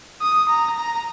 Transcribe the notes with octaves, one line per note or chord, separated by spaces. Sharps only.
D#6
A#5
A#5